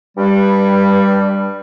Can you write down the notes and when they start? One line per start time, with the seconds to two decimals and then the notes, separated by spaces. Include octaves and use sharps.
0.18 G2 G3